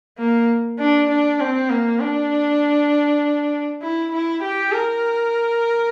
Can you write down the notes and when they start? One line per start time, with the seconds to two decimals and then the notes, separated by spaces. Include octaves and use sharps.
0.18 A#3
0.79 D4
1.09 D4
1.40 C4
1.70 A#3
2.00 D4
3.82 E4
4.11 E4
4.43 G4
4.72 A#4